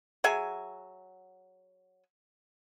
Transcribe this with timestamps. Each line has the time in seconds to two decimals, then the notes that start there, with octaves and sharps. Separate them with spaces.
0.24 F#3 G#4 E5 G#5